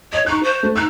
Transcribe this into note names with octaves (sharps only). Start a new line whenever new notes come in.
C#5 D#5
D#4 C#6 F#6
C5
A3
D#4 E6 F#6